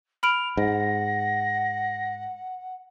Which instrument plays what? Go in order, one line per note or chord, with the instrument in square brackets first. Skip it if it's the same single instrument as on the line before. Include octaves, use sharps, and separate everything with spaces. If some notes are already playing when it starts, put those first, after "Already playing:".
[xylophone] B5 F6 D7 [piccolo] F7
[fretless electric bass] G#2 [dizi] F#5 [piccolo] A#6